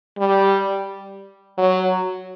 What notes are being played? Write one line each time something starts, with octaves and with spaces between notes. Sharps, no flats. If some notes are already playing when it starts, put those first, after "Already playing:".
G3
F#3